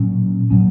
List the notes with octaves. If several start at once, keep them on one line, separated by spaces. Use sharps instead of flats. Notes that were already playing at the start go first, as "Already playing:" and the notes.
Already playing: A#2 F#3 C#4
A#2 F#3 C#4